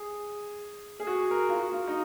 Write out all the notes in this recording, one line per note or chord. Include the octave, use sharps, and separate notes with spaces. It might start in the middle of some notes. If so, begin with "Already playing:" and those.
Already playing: G#4
G#4
F#4
A#4
F4
F#4
F4
D#4